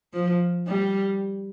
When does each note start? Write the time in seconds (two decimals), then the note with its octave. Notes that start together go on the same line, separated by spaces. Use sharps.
0.13 F3
0.67 G3